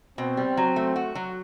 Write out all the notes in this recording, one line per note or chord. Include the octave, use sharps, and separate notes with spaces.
B2 C4
G3
F#3
A3
F#4
F#3